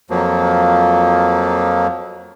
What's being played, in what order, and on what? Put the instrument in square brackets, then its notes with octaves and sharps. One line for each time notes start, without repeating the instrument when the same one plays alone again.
[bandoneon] F2 F3 F#3 A#3